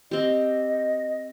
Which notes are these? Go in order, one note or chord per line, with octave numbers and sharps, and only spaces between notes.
C4 G4 D#5